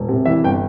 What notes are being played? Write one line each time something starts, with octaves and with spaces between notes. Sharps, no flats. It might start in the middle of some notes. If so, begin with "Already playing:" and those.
Already playing: E1
C3
E3 E5
G1 G5